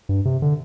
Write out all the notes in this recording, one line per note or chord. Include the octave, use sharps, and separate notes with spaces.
G2
C3
D3